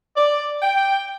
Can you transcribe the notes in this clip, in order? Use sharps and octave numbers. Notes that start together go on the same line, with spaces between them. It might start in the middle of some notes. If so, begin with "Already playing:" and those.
D5
G5